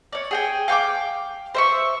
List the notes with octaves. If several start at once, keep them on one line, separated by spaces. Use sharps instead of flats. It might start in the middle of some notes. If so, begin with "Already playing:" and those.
C#5 D5
G#4 G5 G#5
F5 G5 C#6 D6
C5 E5 C#6